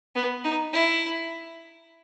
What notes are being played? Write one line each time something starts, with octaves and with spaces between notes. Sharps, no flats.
B3
D#4
E4